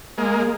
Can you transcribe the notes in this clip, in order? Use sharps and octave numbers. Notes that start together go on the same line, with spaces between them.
G#3 A#3